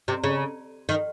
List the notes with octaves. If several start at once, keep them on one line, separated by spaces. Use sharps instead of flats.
C3
C#3
D#3